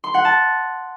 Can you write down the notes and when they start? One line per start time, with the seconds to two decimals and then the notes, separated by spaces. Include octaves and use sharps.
0.04 C6
0.14 F#5
0.25 A5